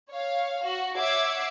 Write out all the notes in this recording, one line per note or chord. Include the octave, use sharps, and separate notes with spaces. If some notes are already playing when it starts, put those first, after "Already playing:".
C#5 F5
F#4
C#5 E5 F#5 D6 G#6 C7